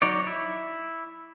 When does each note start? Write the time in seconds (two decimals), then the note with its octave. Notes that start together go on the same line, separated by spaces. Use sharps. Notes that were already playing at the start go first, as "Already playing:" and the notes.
0.02 F#3 D#4 C#5 D5
0.27 E4